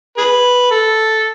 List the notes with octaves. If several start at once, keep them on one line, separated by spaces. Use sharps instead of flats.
G#4 B4
A4